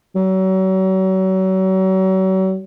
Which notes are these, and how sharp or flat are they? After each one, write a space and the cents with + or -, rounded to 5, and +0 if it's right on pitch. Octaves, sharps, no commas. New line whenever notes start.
F#3 +35